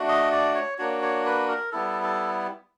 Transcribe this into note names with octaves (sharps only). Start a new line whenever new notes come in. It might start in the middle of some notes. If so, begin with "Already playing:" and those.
Already playing: A3 D4 F#4
D#5
D5
C#5
A#3 D4 F#4 C#5
C#5
B4
A#4
G3 B3 E4 A4
A4